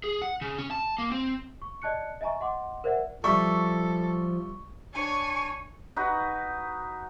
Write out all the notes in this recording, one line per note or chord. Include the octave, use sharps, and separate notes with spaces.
G#4
F#5
C#3
C#4
A5
A#3
C4
C#6
D5 D#5 A5 F#6 C#7
D#5 E5 G#5 A#5 C#6
D#5 F#5 C6 D6
A#4 C5 D5 E5 F#5
F3 G3 A4 E5 C#6
D4 C#5 G#5 C#6
D#4 F#4 B4